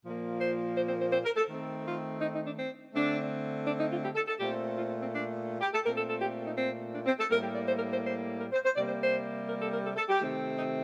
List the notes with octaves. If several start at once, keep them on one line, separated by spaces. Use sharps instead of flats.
A#2 F3 A#3
C5
C5
C5
C5
C5
A#4
A4
D#3 A3 C4
F4
D#4
D#4
D4
C4
D3 A3 C4 D4
D4
D#4
F4
G4
A4
A4
A#2 A3 C4 G4
F4
C4
D4
G4
A4
A#2 A3 C4 A#4
A4
A4
G4
D#4
C4
D4
C4
A4
A2 G3 A#3 A#4
G4
D5
C5
A#4
C5
C5
A#4
C5
C5
C3 G3 A#3 D5
C5
C5
A#4
A4
A#4
A4
A4
G4
C3 D#3 A3 C4
D#4